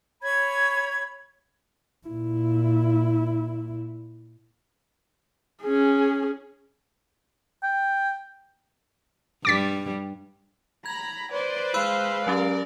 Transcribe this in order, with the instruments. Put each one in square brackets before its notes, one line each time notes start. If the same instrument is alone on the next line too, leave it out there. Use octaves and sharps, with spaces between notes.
[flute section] C#5 B5 G#6
[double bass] A#2 E4
[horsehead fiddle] C#4 G#4
[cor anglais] G5
[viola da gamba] G2 G3 [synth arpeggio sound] D6 A6 B6
[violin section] A#5 [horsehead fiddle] B5 [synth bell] G#6
[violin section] B4 C5 [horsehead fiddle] D5
[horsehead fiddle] G#3 F5 [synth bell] B5 E6 F#6
[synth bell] F#3 C#4 G4 [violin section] A#4 D5